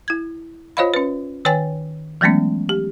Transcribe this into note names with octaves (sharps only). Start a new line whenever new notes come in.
E4 G#6
F4 C5 C#5 D#5 F5 B5
C#4 B4
D#3 B4 C#5 G5 G#5 A6
E3 F#3 G#3 A3 B3 C#4
G4